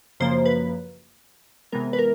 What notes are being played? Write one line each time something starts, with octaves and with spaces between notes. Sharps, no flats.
F#2 C#3 F3 A#3 C5
B4
C3 E3 G#3 B3 A#4
B4
A#4